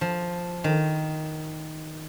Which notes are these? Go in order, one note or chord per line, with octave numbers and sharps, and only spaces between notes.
F3
D#3